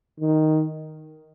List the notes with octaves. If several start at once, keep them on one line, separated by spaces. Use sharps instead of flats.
D#3